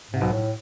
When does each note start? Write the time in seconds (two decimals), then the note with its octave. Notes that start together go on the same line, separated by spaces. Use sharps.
0.11 G#2 C3
0.21 B1 B2
0.33 A2